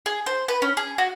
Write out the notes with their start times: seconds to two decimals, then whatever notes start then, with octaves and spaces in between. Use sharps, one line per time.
0.06 G#4
0.26 C5
0.48 B4
0.62 C#4
0.77 G#4
0.98 F#4